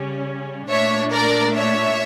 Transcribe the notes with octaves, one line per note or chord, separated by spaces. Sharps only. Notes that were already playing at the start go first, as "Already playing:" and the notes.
Already playing: C#3 G3 C#4
A#2 A3 D4 C#5 E5
A#4 D5
C#5 E5